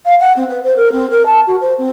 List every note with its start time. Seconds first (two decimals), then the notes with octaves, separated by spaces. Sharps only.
0.05 F5
0.20 F#5
0.36 C4
0.49 B4
0.63 C5
0.76 A#4
0.92 C4
1.10 A#4
1.26 A5
1.47 F#4
1.61 C5
1.78 C4